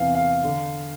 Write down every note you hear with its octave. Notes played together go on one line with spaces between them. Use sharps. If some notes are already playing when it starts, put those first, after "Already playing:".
Already playing: E2 C3 E3 F5
F5
D3